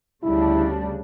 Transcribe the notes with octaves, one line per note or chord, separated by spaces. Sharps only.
D2 C#3 G3 D4 E4